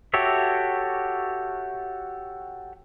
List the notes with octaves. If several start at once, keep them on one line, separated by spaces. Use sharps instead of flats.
F#4 G4 A4 C#5 E5